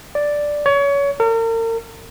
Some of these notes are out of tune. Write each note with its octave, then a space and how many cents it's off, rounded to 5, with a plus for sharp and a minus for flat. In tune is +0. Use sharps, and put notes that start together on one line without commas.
D5 +0
C#5 +25
A#4 -40